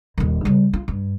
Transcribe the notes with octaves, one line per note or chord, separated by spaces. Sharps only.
D#1 D#3
C#3 G3
F4
G2